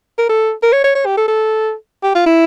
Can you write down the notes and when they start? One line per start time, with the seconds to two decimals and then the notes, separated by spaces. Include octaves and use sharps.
0.18 A#4
0.29 A4
0.63 A#4
0.73 C#5
0.84 C#5
0.95 C#5
1.06 G4
1.17 A4
1.28 A4
2.03 G4
2.15 F4
2.26 E4